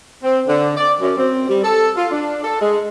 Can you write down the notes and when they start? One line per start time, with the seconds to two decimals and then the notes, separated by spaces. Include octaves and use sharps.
0.23 C4
0.48 D3
0.77 D5
1.01 F#2
1.18 C4
1.48 G3
1.63 A4
1.97 F4
2.12 D4
2.44 A4
2.61 G#3